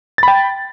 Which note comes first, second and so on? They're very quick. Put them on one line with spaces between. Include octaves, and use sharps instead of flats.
A6 B5 G5